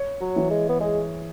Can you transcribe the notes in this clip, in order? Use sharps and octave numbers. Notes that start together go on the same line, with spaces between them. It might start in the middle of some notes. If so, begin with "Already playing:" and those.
Already playing: C#5
F#3
E3
G#3
B3
G#3 G#4